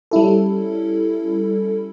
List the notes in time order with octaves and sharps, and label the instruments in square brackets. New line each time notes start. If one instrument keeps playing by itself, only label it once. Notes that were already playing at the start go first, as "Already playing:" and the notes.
[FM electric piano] G3 C#4 E4 A4